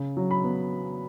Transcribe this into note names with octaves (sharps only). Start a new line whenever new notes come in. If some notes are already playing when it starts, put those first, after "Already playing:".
Already playing: C#3
F#3
B5
B3